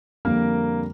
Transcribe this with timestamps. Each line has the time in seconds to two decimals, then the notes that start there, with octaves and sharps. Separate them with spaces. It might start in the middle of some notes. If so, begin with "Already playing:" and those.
0.25 F2 D3 G3 A#3 A#4